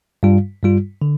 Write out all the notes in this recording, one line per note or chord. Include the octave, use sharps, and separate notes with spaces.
G2 G3 F4
G2 G3 F4
D3